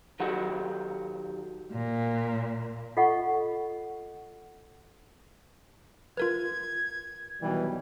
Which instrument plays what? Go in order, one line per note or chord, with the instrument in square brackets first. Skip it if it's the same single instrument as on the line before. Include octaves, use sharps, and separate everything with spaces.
[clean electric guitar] D#3 F#3 G4 A4 F#5
[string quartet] A#2
[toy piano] F4 A4 D#5 F#5 C#6
[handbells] F4 A#4 B4 [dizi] G#6
[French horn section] B2 D#3 F#3 [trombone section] E3 G3